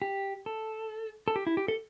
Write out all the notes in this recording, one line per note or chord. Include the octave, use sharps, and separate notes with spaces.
G4
A4
A4
G4
E4
G4
A4